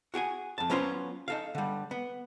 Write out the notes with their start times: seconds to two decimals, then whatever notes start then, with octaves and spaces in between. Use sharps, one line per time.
0.14 F#4 G#4 G5 G#5
0.58 F2 A5
0.70 F#3 B3 C#4 F4 B4 C5
1.28 D#4 A4 F5
1.55 D3 G3
1.91 B3